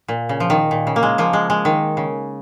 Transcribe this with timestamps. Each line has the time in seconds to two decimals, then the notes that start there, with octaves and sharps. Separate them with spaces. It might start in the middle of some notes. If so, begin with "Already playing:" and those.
0.08 A#2
0.29 C#3
0.40 F3
0.50 D#3
0.71 A#2
0.87 C#3
0.96 A#3
1.03 G#3
1.18 F3 A#3
1.33 G#3
1.50 G#3
1.65 D#3
1.97 C#3